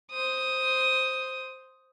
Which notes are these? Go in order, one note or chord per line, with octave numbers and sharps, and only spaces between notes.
C5 D#6